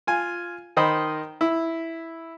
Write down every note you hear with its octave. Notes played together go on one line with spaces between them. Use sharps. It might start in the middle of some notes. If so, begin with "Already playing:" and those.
F4 G#5
D#3 C5 D#5 B5
E4